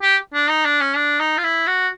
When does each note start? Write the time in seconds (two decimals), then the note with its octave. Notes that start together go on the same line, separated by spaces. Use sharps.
0.02 G4
0.34 D4
0.50 D#4
0.65 D4
0.81 C#4
0.96 D4
1.20 D#4
1.38 F4
1.44 E4
1.67 F#4